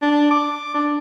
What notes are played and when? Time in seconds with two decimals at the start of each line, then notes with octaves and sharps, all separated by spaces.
0.02 D4
0.31 D6
0.74 D4